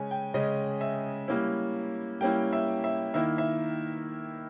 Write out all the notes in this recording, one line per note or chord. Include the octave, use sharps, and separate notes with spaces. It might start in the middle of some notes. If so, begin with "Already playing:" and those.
Already playing: C#3 G#3 C#4 G#5
G5
C#3 G#3 C#4 D#5
E5
G3 A#3 C#4 E4
G3 A#3 C#4 E4 G5
E5
E5
D#3 A#3 E4 E5
E5